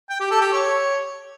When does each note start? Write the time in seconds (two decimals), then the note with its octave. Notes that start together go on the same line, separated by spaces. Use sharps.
0.10 G5
0.20 G4
0.31 A4
0.42 G4
0.52 C#5